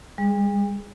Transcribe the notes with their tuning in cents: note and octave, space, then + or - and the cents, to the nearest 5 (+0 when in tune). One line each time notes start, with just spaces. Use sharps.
G3 +45 G#4 +0